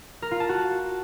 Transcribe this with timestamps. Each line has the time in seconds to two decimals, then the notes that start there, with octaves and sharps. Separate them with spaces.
0.22 A#4
0.31 F4
0.40 A5
0.49 F#4